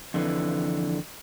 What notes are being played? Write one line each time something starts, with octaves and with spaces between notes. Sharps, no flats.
F2 D3 E3